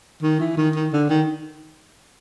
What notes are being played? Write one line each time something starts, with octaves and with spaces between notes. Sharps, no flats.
D#3
E3
D#3
D#3
D3
D#3